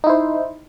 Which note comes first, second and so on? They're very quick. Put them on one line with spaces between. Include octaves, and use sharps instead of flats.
D#4 E4 C5